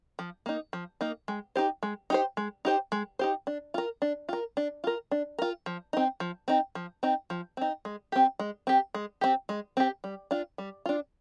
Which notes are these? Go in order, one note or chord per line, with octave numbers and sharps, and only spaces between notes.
F3
A#3 D#4
F3
A#3 D#4
G#3
D#4 G4 C5
G#3
D#4 G4 C5
G#3
D#4 G4 C5
G#3
D#4 G4 C5
D4
F4 A#4
D4
F4 A#4
D4
F4 A#4
D4
F4 A#4
F3
C4 D#4
F3
C4 D#4
F3
C4 D#4
F3
C4 D#4
G#3
C4 G4
G#3
C4 G4
G#3
C4 G4
G#3
C4 G4
G3
D4 F4
G3
D4 F4